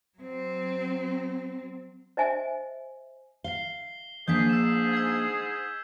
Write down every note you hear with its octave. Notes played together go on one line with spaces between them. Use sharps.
F#3 C4
C5 D#5 E5 G#5
F5 C7 G7
G#2 F3 A#3 D4 G#4 G6 B6
E6 E7
E6 G#6